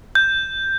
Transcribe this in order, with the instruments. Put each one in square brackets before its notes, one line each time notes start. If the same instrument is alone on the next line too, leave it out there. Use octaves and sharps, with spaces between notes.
[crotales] G6